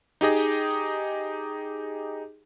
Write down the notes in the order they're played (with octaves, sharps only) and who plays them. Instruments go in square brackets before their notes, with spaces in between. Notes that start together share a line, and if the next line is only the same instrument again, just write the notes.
[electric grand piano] D#4 G4 G#4 D#5